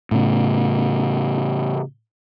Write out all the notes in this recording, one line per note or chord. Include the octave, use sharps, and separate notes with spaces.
A2 C#3